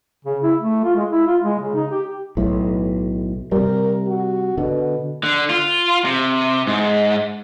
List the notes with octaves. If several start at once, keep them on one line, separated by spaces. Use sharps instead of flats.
C#3
E4
A3
F4
G#3
E4
F4
G#3
C#3
D#4
G4
B1 A2
C3 G3 A#4
F#4
B2 D3
D3
F4
C3
G#2